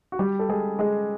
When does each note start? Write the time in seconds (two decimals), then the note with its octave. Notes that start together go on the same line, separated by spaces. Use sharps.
0.12 F#4
0.19 G3 G4
0.39 A4
0.49 G#3 G#4
0.79 G#3 G#4